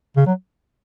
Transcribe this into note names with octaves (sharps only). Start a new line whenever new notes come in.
C#3
F#3